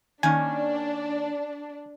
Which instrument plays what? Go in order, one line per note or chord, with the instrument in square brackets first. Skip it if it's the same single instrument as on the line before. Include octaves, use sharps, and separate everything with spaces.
[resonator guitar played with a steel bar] D#3 A#3 C#4 [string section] D4 [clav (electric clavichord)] G#5